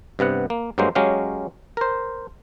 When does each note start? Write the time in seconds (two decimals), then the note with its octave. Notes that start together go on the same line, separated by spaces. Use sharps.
0.19 G2 C3 B3 F#5
0.50 A#3
0.78 G2 F#3 G#3 A#3 C5
0.95 F#3 G#3 C#4 G4 F5
1.77 A#4 C5